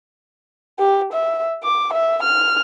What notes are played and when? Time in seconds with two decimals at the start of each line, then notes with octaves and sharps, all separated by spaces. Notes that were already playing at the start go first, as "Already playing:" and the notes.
0.79 G4
1.13 E5
1.63 D6
1.93 E5
2.23 F6